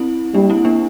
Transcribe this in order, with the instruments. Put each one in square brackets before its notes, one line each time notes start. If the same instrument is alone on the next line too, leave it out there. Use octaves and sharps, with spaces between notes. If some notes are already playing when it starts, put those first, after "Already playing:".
Already playing: [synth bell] C4 E4
[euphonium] G3 [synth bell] A#3 D4
[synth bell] C4 E4
A#3 D4